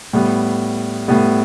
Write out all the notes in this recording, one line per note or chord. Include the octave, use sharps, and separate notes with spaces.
A2 G3 B3
A2 G3 B3